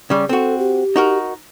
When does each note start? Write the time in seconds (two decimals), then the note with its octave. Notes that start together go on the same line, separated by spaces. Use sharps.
0.10 C#3 G3
0.29 C4 F#4 A4
0.59 G4
0.96 D#4 F#4 A#4